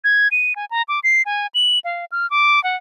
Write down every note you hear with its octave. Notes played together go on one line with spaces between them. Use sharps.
G#6
D#7
G#5
A#5
D6
C7
G#5
F#7
F5
F6
D6
F#5